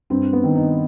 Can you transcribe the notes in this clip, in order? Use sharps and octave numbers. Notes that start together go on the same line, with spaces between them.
G2 C4
B3
D#3
D#4